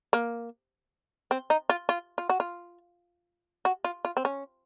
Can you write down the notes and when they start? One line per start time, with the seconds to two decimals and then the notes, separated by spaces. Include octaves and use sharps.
0.13 A#3
1.31 C4
1.50 D#4
1.69 F4
1.89 F4
2.18 F4
2.29 F#4
2.40 F4
3.65 F#4
3.84 F4
4.05 F4
4.17 C4
4.25 C#4